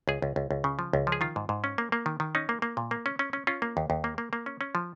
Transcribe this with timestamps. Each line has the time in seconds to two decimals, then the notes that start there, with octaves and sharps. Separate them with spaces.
0.08 C#2 G#4
0.22 C#2
0.36 C#2
0.51 C#2
0.64 C#3
0.79 F3
0.93 C#2
1.07 F3
1.12 G#4
1.21 D#3 F4
1.36 G#2
1.49 G#2
1.64 C#4
1.78 A#3
1.92 A#3
2.06 D#3
2.20 D#3
2.35 C#4 D#4
2.49 A#3
2.62 A#3
2.77 A#2
2.91 A#3
3.06 C#4
3.19 C#4
3.33 C#4
3.47 C#4 F4
3.62 A#3
3.77 D#2
3.90 D#2
4.04 A#3
4.18 A#3
4.33 A#3
4.46 C#4
4.61 C#4
4.75 F3